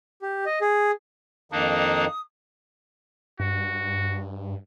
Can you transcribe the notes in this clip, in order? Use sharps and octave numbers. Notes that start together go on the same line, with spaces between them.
G4
D#5
G#4
F2 D#3 A#3 D4 D#4 D#6
G2 F#4